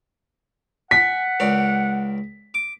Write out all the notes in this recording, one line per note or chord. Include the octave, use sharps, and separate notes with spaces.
F#5 G#5 B6
C#2 A#4 D5
D6